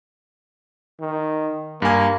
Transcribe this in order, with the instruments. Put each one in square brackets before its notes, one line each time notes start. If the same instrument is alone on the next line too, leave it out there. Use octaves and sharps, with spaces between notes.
[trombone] D#3
[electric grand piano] G2 G#5 [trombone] A#3